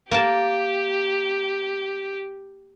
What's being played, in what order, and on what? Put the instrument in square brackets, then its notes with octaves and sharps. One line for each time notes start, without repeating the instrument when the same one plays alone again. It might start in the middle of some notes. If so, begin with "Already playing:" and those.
[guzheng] A#3 A#4 A5 [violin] G4